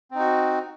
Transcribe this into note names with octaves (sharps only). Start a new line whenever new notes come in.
C4 D#4 F#4